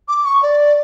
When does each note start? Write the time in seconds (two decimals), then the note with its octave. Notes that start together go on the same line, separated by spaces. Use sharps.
0.08 D6
0.25 C#6
0.43 D5